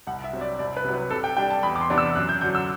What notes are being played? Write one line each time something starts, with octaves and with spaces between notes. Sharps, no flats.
C2 F#5
E5
C3 F#3 C4
D5
C2 D5
B4
C3 F#3
B4
C3 A4
G5
G3 D4 G5
A5
E2 B5
D6
C6
C3 E3 B3 D4
E6
F#2 F#6
G6
D3 F#3 G6
E6